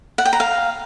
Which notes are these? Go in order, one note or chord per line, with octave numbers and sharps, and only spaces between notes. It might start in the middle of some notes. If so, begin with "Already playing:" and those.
F#5
G5
A#5
F5